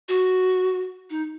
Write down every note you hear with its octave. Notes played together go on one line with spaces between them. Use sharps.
F#4
D#4